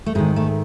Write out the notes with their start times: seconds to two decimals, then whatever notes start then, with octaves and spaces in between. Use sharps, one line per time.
0.06 A3
0.15 G#2 D#3 G#3
0.36 A3